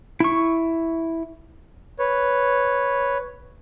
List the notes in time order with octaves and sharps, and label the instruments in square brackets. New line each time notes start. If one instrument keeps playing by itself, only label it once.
[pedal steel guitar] E4 C#6
[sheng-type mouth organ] B4 C#5